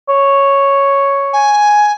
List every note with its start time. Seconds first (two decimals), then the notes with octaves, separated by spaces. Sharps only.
0.09 C#5
1.33 G#5